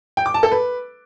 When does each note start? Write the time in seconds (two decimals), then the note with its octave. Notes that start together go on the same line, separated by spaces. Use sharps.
0.17 G5
0.26 D6
0.34 A5
0.43 A4
0.52 B4